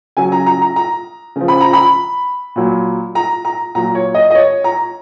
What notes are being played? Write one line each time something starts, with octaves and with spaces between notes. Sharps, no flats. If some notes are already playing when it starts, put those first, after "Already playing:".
C#3 F#3 G#5
A#5
A#5
A#5
A#5
C#3 F3
B5
A#5
B5
A#2 F#3
A#5
A#5
A#2 F#3 A#5
C#5
D#5
D#5
C#5
A#5